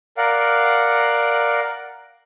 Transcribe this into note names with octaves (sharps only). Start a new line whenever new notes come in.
A#4 D5 F5 F#5